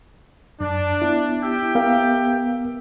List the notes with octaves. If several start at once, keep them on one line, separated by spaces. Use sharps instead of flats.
F#2 D4
B3 E4
G4 E5 G5
B3 A#4 F5